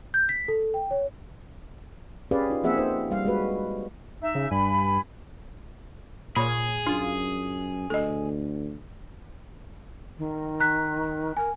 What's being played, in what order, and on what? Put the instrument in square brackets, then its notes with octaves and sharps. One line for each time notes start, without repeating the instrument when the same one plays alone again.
[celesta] G6
B6
A4
G5
C#5
[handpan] C#4 G4 G#4 B4 D5 F5
D#4 F4
F3 A#3 C4 G#4 E5 F#5
D#4 C5
G3 F5
G#3 F#4 B4
[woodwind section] D#4 E5
[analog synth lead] C#3
[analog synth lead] G2 [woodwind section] G#5 B5
[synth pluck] A#2 C#5 [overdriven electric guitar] G#4 [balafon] B5
[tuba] F#2 [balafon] D4 [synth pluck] F4
[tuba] D2 [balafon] A4 D#5
[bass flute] D#3
[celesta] A#5 F#6 B6
[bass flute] A#4 [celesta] G#5